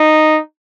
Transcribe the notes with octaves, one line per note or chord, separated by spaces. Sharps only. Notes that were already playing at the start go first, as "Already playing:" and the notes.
Already playing: D#4